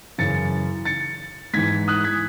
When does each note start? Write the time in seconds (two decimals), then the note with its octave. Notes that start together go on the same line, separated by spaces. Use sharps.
0.18 F#2 C#3 E3 A6 C#7
0.85 A6 C#7
1.53 G#2 E3 G#6 B6
1.88 D#6 F#6
2.04 G#6 B6